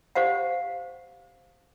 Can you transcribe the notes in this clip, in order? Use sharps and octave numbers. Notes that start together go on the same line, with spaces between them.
G4 C5 F5 F#5